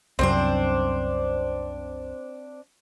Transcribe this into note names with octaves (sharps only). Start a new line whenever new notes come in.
C2 F#2 C4 D4 C5